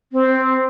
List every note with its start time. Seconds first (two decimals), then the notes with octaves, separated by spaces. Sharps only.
0.12 C4